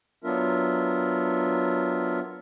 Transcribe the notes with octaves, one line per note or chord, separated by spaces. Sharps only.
F#3 B3 D4 F4 A#4 E5